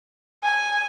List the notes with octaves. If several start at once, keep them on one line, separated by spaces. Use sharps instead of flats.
G#5